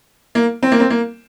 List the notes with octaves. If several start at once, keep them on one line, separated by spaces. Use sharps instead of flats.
A#3
C4
A#3
C4
A#3